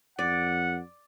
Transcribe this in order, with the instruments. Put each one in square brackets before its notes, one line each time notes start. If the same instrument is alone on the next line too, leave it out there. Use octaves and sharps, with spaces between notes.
[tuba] F2 [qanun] D5 [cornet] F#5